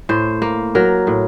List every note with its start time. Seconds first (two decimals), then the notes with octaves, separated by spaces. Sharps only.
0.09 A2 C5
0.42 A#3
0.75 F#3 A#4
1.07 A2